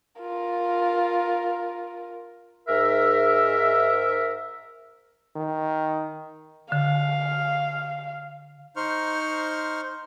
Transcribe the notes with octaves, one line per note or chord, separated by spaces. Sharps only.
F4 A#4
G#2 A#4 E5
D#3
D3 F5
D#4 C5 C6 C#6 F6